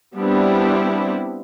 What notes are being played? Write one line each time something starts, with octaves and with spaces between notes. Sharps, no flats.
G3 B3 C4 D4 E4 G4